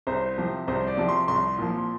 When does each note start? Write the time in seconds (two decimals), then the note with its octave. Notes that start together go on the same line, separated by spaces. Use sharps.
0.07 C2 C5
0.38 C3 F3
0.68 C2 C5
0.87 D5
0.97 C3 F3
1.09 C6
1.28 C2 C6
1.58 A#2 F3